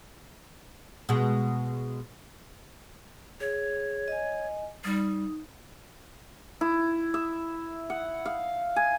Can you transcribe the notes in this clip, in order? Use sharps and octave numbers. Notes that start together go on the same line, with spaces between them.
B2 G#3
G#4 C#5
D#5 G#5
G3 D#4 D#6
E4
E5
F#5
F5
G#5